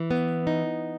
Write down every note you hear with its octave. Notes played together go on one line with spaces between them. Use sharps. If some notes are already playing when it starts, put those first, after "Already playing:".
Already playing: E3
B3
D#4